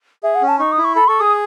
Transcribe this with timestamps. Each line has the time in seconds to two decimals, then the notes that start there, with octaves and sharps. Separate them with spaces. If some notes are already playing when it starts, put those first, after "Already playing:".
0.23 G#4 E5
0.35 F#5
0.42 C#4
0.48 A5
0.59 D#4 C#6
0.72 D#6
0.78 E4
0.84 C#6
0.95 A4 B5
1.08 A4 C#6
1.20 G#4 D#6